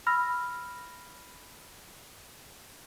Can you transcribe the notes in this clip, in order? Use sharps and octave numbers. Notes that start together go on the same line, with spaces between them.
B5 E6 F6 A#6